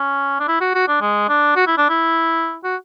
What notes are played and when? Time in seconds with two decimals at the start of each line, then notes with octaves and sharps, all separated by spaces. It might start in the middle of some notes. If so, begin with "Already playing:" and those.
Already playing: C#4
0.40 D4
0.48 E4
0.61 F#4
0.75 F#4
0.88 D4
1.01 G#3
1.29 D4
1.56 F#4
1.67 E4
1.77 D4
1.89 E4
2.64 F#4